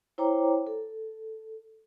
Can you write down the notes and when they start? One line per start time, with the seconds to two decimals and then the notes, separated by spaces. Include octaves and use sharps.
0.18 E4 C5 C#5 G5 A#5 D6
0.67 A4